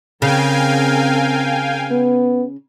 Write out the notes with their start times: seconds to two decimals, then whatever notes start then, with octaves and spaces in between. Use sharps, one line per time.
0.22 C#3 C4 A#4 F5 G5 G#5
1.91 B3